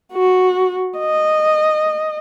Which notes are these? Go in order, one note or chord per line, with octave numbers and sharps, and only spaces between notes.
F#4
D#5